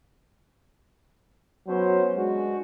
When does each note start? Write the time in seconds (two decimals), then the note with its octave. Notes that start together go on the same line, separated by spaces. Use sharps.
1.68 F#3 B3 C#4 C5
2.16 G#3 D4 F#4